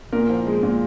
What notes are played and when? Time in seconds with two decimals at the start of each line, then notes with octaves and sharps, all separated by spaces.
0.12 A#2 A#4
0.29 F3
0.47 G#3
0.63 A#2